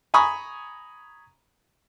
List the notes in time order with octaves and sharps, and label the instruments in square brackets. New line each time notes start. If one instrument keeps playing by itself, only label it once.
[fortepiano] G#5 A#5 B5 C#6 D#6